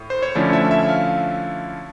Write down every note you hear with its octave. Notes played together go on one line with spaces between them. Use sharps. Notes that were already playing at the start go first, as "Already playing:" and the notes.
Already playing: A2
C5
C#5
D3 F3 A3 C#4 E4 D5
E5
E5
F5